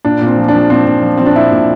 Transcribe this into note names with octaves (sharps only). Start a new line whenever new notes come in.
A#2 D4
A#2
C4
F3
D4
F3
A#2 C4
A#2
F3
F3 C4
D4
A#2 E4
A#2